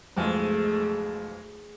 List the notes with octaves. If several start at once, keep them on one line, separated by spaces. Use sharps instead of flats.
B1 F2 G#2 G#3 A3